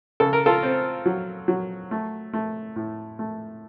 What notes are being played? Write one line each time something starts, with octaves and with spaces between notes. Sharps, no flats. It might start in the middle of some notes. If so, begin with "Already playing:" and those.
C#3 A4
A#4
F4 A4
C4
F#3
F#3
A3
A3
A2
A3